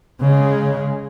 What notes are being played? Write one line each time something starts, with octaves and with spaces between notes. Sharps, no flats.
C#3 G#3